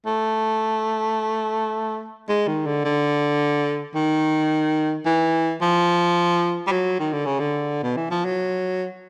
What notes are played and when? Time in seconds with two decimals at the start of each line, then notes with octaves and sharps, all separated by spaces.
0.06 A3
2.29 G#3
2.48 D#3
2.66 D3
2.85 D3
3.95 D#3
5.06 E3
5.62 F3
6.67 G3
6.72 F#3
7.00 D#3
7.13 D3
7.26 C#3
7.40 D3
7.83 B2
7.97 E3
8.11 F3
8.25 F#3